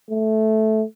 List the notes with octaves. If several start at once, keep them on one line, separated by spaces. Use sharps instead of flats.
A3